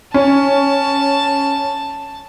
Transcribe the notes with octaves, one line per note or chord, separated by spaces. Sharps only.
C#4 A5